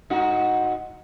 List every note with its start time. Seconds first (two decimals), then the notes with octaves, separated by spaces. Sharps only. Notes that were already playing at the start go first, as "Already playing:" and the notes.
0.10 G#2 D#4 F#4